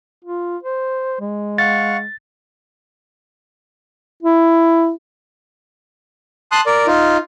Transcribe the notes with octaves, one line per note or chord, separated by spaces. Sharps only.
F4
C5
G#3
F5 F#5 C#6 A6
E4
A5 C6 D#6 F#6
A#4 D5
D#4 F4